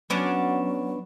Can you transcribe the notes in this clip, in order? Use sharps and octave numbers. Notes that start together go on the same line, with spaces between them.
F#3 B3 C#4 D4